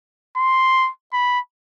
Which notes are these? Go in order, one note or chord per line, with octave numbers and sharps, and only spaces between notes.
C6
B5